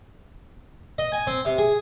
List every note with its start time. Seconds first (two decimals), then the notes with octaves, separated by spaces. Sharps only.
0.98 D#5
1.12 G#5
1.27 C4
1.45 C3
1.58 G#4